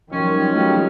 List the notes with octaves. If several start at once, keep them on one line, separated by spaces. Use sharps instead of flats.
F#2 D#3 F3 G3 C#4
A3 F4 G4